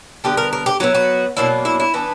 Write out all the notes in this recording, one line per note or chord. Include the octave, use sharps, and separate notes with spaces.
D3 G3 B3 G4
A#4
A#4
G4
F#3 B3 E4 F#4
F#4
B2 F#3 A#3 D4 E4
E4
E4
E3 B3 D4